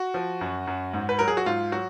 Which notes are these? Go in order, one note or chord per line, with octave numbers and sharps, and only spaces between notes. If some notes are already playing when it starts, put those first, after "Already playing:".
Already playing: F#4
F3
F#2
F#2
G#2
B4
F#3 A#4
G#4
F#4
G#2 F4
F#3 F#4